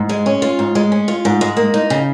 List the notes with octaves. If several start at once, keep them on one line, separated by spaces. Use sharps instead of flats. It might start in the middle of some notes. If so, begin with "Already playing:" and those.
Already playing: G#2
G#3
C#4
F4
G#2
G#3
C#4
F4
G#2
G#3
A#3
D#4
C#3